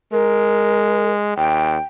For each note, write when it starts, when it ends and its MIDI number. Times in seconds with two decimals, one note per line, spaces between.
0.12 1.34 56
0.12 1.10 70
1.37 1.76 39
1.37 1.81 79